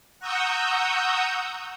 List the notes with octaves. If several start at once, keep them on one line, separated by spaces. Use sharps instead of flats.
F#5 A#5 C#6 D#6 E6 G6